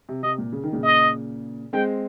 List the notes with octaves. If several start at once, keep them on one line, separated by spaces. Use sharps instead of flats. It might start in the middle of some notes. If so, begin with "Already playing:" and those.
C3
C3 D#5
A#2
C#3
D#3
A#2 C#3
D#5
G#3 C4 G5